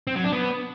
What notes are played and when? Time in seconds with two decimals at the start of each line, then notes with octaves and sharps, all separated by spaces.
0.07 C4
0.16 F#3
0.24 D4
0.33 B3